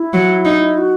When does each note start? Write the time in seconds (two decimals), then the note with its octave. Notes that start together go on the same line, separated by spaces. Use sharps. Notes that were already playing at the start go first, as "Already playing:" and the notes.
Already playing: E4
0.14 F#3
0.45 D#4
0.78 F#4